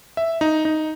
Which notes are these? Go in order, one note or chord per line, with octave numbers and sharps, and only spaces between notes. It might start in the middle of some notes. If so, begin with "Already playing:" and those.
E5
D#4
D#4